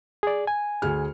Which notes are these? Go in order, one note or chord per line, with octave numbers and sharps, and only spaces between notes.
G#4 D5
G#5
D2 G#4 F6